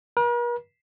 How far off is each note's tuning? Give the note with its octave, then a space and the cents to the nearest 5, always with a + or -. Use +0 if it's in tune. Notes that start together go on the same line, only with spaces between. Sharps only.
A#4 +45